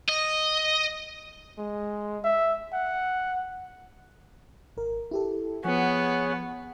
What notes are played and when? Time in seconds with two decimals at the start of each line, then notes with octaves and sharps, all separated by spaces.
0.09 D#5
1.58 G#3
2.24 E5
2.73 F#5
4.77 G#1 A#4
5.11 E4 G4 A4
5.65 F3 B3 G#4 C#5 F#5